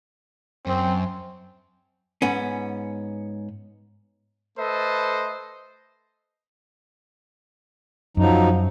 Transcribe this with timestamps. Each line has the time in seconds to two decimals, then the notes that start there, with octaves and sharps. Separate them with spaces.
0.66 F#2 C4
2.22 G#2 B3 C#4
4.58 A3 A4 B4 C5 D#5
8.17 F#2 F3 F#3 D#4